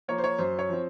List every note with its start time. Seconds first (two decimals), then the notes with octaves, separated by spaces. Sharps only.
0.08 F3 A#3 C#5
0.18 C5
0.24 C#5
0.38 F#2 C5
0.59 C#5
0.69 F3 C4